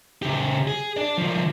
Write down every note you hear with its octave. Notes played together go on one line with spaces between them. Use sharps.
C#3 G4
G#4
D4 D5
D3 F3